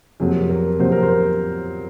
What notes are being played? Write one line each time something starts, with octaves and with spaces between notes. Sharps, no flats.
F2 C3 F#3 A#3 G#4
A#4
F2 C3 F#3 A#3 C5
A#4
C5